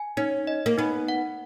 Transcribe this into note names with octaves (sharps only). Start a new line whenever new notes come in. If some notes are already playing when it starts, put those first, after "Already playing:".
Already playing: G#5
C#4 D#4
D#5
A#3
B3 D#4
F#5